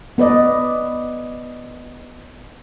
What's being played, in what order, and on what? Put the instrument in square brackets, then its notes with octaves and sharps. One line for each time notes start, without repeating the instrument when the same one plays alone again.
[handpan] B3 B4 D5 D#5